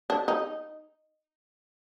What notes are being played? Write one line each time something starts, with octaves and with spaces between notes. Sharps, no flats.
D4
D#4